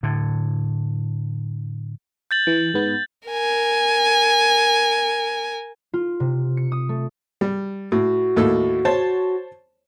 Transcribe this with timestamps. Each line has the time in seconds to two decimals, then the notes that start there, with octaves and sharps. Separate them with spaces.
0.03 A2 D3
2.31 G6 A6 F#7
2.47 E3
2.74 G#2 B3
3.29 A#4 G#5
5.94 F4
6.20 C3
6.57 C#7
6.72 D#6
6.89 A3
7.41 G3
7.92 A2 F#4
8.36 D#2 A2 A4
8.85 C5 C#5 A5